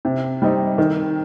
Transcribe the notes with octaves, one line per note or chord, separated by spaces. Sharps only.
C3
G3 C4 D#4
D#3